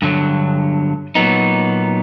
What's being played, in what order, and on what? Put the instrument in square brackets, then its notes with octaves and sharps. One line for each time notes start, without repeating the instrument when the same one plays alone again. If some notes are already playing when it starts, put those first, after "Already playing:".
[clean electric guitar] G2 D3 F#3
A#2 F#3 B3 D#4